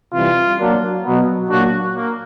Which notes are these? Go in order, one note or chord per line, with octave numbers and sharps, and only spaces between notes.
C3 E3 G3 F4
F#3 A#3 D4
B2 F#3 B3
A#2 F#3 A#3 D4 F#4
A#3